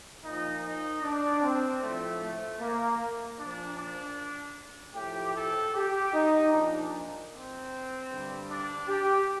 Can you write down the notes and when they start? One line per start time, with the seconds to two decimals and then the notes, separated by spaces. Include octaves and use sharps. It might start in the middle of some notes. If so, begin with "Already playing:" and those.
0.23 A#2 F3 D#4
0.63 D#4
1.02 D4
1.42 C4
1.80 A2 F3 A3
2.20 A3
2.59 A#3
3.37 A#2 F3 D4
3.77 D4
4.95 A2 F3 G4
5.35 A4
5.74 G4
6.12 D#4
6.52 A#2 F3 D4
7.31 C4
8.10 G2 D3 G3
8.49 D4
8.88 G4